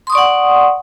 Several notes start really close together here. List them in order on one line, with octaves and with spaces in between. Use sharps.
C6 D#6 C#6 D5 F#5